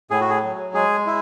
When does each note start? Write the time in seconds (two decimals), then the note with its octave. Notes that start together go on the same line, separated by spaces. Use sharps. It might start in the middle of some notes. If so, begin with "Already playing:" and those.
0.11 A2 G#4
0.21 F#4
0.30 G#4
0.43 F#3
0.74 G#3 G#4
1.06 E4